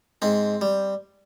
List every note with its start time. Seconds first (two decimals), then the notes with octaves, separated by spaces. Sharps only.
0.22 G#2 C4
0.61 G3